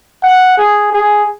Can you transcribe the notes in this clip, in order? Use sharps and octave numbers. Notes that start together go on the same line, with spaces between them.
F#5
G#4
G#4